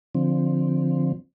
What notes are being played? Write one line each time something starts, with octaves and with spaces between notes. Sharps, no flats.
D3 F3 C4